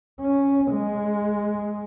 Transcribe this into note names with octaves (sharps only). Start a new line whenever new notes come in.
C#4
G#3